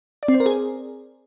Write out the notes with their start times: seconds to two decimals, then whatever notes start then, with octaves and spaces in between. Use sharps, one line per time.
0.23 D5
0.28 C4
0.34 C5
0.40 A#4
0.46 G#4